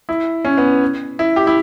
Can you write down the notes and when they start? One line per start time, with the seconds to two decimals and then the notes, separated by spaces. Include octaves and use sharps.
0.09 E4
0.45 C#4
0.58 B3
1.19 E4
1.36 G4
1.47 E4